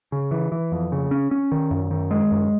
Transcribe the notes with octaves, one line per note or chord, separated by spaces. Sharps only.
C#3
E3
E3
F2
C#3
C#4
C#4
D#3
F#2
D#3
G#3
F#2